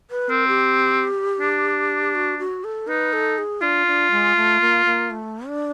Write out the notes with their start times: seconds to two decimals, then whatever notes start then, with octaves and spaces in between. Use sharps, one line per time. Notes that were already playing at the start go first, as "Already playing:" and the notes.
0.11 B4
0.30 C4 A#4
0.48 G4
1.40 D4
2.15 F#4
2.39 F#4
2.64 A4
2.88 D#4 B4
3.13 A4
3.38 G#4
3.62 D4 F4
3.87 D4
4.11 G#3
4.36 A3
4.61 A#3
4.86 A#3
5.11 A3
5.48 D4